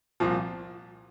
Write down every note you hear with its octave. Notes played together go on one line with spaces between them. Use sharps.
C2 A#2 F3